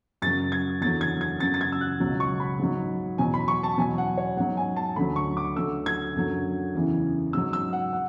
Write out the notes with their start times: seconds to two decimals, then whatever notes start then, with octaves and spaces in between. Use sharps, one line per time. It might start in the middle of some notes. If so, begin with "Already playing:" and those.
0.22 F#2 C#3 F#3 A6
0.52 G#6
0.81 E2 D3 F#3 A6
1.01 G#6
1.21 G#6
1.40 F#2 C#3 F#3 A6
1.54 A6
1.61 G#6
1.72 E6
1.81 F#6
2.00 C#2 B2 F#3
2.20 C#6
2.40 B5
2.59 G#2 F#3
3.18 E2 B2 F#3 G#5
3.34 B5
3.48 C#6
3.63 A5
3.78 E2 B2 F#3 G#5
3.98 F#5
4.18 C#5
4.37 G#2 F#3 F#5
4.57 G#5
4.76 A5
4.96 D2 D3 F#3 B5
5.16 C#6
5.37 D6
5.56 D2 D3 F#3 E6
5.86 G#6
6.15 F#2 D3 F#3
6.75 E2 C#3 E3
7.33 G#2 F#3 E6
7.53 E6
7.73 F#5
7.93 F#5